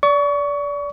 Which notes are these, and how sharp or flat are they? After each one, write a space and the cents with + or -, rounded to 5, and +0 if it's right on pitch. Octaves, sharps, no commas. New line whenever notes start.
D5 -25 C#6 +25